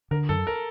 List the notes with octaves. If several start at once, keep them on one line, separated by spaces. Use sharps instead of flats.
D3 A#4
F#2 A4
A#4